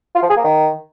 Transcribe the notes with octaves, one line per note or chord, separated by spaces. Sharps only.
F4
F3
G#4
A#3
D#3